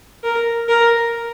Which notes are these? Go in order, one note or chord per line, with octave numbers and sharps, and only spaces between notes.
A#4
A#4